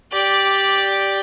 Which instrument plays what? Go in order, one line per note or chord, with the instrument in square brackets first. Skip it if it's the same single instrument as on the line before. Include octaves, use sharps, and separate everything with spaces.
[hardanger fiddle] G4 D5